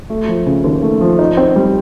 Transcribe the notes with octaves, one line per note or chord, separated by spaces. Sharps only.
A3
F3
C#3
D#2
A3
F3
D#4
C4
G3